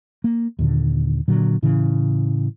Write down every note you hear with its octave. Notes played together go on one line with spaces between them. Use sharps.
A#3
D#2 A#2 D3
A#2 D3 F#3
A2 C#3 E3